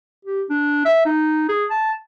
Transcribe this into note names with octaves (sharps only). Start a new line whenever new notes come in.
G4
D4
E5
D#4
G#4
A5